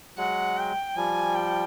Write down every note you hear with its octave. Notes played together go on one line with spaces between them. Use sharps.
F#3 G#3 F#5
G5
F3 G3 G#5
G5